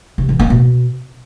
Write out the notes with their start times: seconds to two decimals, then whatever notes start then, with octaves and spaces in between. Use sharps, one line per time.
0.18 C3
0.29 E3
0.39 A#3
0.50 B2